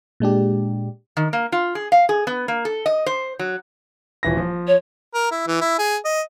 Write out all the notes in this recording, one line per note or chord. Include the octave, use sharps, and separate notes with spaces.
A#2 G#3 D4 G4
D#3
A#3
F4
G#4
F5
G#4
B3
A#3
A4
D#5
C5
F#3
D#1 E3 A#6
F3
C#5
A#4
E4
E3
E4
G#4
D#5